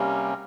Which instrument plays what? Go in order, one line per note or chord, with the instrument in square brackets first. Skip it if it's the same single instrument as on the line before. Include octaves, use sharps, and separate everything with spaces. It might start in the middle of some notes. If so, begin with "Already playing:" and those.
Already playing: [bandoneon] C3 G3 A#3 C#4